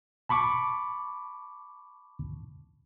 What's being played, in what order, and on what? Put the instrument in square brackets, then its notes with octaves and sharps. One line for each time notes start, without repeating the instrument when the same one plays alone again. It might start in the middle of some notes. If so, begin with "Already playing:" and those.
[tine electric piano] A5 B5 C#6 D6